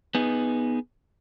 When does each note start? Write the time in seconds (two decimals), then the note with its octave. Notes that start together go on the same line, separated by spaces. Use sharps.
0.15 B3 D#4 G#4